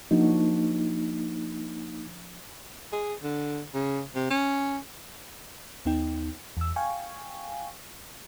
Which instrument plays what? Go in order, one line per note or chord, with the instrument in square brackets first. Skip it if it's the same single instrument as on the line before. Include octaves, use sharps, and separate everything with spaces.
[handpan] F3 D4 F#4 [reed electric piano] A#3 D#4
[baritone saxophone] G#4
D3
C#3
C3
C#4
[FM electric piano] D#2 B3 D#4 G5
E2 E6
F5 G5 G#5 C#6